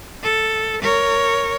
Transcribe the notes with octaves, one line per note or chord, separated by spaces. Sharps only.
A4
A#4 C#5